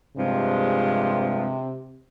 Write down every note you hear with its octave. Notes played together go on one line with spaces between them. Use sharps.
G2 C3 F3 G#3